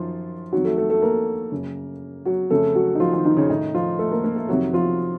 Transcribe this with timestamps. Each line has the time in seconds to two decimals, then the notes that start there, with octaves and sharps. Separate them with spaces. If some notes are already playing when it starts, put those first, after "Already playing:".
Already playing: F#2 D#3 F3 F4
0.52 F2 D#3 F#3 F#4
0.65 A3 A4
0.78 A3 A4
0.90 A3 A4
1.02 A#3 A#4
1.52 F#2 C#3
2.25 F#3 F#4
2.50 F2 C#3 A3 A4
2.75 F#3 F#4
2.95 D#4
3.00 F3 F4
3.13 D#3 D#4
3.25 D#3 D#4
3.37 C#3 C#4
3.49 A2 D#3 D#4
3.75 F3 F4
3.99 A3 A4
4.11 A#3 A#4
4.24 A#3 A#4
4.36 A3 A4
4.48 F2 C3 D#3 F#3 F#4
4.73 F3 F4